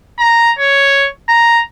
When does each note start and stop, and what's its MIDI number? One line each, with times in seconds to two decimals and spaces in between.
0.19 0.51 82
0.59 1.09 73
1.29 1.62 82